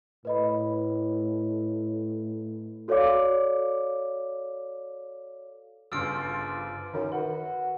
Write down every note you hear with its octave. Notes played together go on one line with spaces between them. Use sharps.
A2 B4 D#5 B5
F#4 A4 C#5 D5 F5 D6
G1 C#3 F4 C5 D5 E6 F6 D7
F#2 D#3
F#4 B4